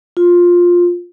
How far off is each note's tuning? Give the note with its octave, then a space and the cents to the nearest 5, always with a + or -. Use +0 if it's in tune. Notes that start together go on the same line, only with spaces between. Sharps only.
F4 +10